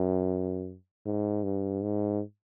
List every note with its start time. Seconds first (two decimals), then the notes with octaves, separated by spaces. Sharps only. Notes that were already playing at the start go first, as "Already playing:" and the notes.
Already playing: F#2
1.06 G#2
1.44 G2
1.82 G#2